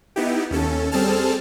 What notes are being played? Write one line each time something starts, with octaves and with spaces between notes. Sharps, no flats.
B3 D#4 E4 G4
D#2 C#4 A4
G3 C4 G#4 A4 A5 F6